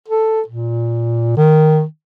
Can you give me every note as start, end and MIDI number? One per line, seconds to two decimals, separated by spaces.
0.08 0.41 69
0.48 1.33 46
1.37 1.83 51